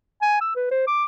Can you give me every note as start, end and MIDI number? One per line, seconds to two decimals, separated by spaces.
0.22 0.40 80
0.41 0.54 88
0.55 0.69 71
0.71 0.83 72
0.87 1.05 86